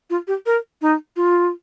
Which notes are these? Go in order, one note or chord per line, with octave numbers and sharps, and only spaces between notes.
F4
G4
A#4
D#4
F4